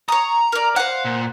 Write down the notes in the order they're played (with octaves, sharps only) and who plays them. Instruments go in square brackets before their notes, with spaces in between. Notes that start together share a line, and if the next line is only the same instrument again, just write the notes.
[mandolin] C#5 D#6 [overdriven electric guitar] A#5
[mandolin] A#4 D5
[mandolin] C5 F#5 [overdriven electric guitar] F5
[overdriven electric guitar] A#2